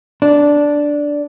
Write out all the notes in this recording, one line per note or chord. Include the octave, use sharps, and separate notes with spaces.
D4